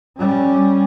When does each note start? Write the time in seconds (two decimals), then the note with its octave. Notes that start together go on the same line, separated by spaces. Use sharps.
0.18 G3 C#4